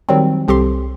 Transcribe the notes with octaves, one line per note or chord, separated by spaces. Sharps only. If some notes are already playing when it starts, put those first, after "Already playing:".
D#3 F#3 G3 C4
C2 C4 G4 A4 C6